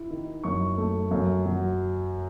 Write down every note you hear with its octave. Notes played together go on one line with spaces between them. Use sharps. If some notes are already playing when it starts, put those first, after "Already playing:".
Already playing: E4
D#3
F#2 C#6
A3
F#2
F#3